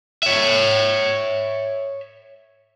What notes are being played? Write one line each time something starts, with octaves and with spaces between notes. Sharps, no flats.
C#5 E5